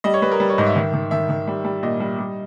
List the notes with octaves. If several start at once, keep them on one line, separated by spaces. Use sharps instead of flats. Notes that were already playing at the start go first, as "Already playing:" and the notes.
G3 D#5
C#5
G3 B4
A#4
G3
C#5
G#2 D#5
E5
D#3
D#3
D#3 E5
D#3
G3
G3
A#2 D#5
G3
G3